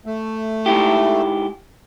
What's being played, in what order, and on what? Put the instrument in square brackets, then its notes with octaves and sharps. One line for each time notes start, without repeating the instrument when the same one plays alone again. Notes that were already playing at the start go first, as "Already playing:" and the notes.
[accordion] A3
[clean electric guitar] G#2 E4 G4